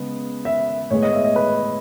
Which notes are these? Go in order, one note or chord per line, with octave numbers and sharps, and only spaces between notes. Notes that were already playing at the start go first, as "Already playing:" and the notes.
Already playing: C#3 G#3 B3
E5
A2 G#3 B3 C#5
D#5
E5
D#5
B4